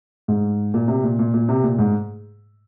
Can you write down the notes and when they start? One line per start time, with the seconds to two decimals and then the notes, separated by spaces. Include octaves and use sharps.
0.28 G#2
0.74 A#2
0.88 C3
1.03 A#2
1.19 A#2
1.34 A#2
1.49 C3
1.63 A#2
1.79 G#2